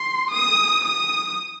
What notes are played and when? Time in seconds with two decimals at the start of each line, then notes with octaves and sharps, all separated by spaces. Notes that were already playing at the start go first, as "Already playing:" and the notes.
Already playing: C6
0.31 D#6
0.85 D#6